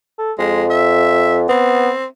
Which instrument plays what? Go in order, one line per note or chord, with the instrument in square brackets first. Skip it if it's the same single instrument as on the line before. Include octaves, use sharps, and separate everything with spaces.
[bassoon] A4
[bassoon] F2 [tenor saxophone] G#3
[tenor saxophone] E5
[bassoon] B3 [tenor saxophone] C4